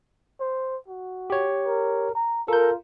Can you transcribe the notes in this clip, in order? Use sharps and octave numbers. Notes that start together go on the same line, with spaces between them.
C5
F#4
G4 C#5
A#4
A#5
F4 A4 A#4 G6